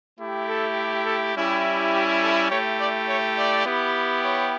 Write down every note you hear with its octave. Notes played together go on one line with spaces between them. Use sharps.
A3 E4 G4
A4
A4
G3 C#4 E4 G4
G4
A4
A3 E4 G4 C#5
D5
C#5
D5
B3 E4 G4
C#5